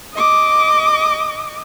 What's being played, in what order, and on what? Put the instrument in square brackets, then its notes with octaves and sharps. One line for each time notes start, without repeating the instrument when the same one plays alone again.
[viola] D#5 D6